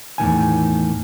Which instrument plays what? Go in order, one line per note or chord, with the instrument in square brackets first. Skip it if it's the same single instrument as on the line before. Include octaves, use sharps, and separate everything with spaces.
[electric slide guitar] E2 A2 D#3 G#5